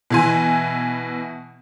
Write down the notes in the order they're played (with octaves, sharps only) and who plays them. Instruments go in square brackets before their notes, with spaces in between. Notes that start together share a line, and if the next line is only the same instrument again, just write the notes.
[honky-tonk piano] B2 E3 G#5